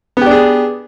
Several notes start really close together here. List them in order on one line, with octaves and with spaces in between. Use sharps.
B3 G4 D4 G#4